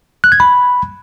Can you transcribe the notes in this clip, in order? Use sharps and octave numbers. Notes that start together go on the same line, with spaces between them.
F#6
G#6
B5